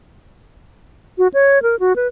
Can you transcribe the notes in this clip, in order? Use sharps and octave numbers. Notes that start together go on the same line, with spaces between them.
F#4
C#5
A#4
F#4
B4